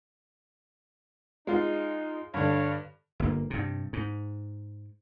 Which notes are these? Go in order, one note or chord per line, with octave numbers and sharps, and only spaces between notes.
G#3 D#4 F4
G2 D3 C#5 F5
G1 A#3
G2 C3
G#2